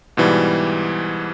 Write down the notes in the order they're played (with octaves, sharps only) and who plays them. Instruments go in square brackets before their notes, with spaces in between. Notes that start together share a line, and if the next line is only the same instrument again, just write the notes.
[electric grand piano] G#2 B2 E3 G3